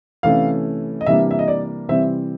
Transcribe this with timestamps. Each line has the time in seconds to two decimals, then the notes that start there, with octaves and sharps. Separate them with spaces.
0.23 C3 E3 A3 C#4 F5
1.01 D#5
1.06 C3 E3 G3 A#3 D4 E5
1.31 E5
1.39 D#5
1.48 D5
1.89 C3 E3 G3 C4 E5